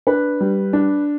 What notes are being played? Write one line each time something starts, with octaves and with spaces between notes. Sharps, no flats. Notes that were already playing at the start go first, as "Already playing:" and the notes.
D4 B4
G3
D4